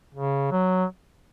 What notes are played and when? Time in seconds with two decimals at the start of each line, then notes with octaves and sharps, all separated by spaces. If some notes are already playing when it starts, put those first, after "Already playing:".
0.14 C#3
0.51 F#3